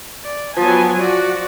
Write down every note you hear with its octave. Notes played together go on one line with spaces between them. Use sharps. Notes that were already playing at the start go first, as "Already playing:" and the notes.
D5
F3 F#3 B3 G#5 A5
F#4 D5